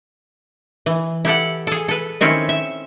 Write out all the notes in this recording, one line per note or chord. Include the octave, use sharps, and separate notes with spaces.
E3
E4 G4 A4 F#5
G#4 A4
A4 B4
D#3 C4 C#4 E4
E5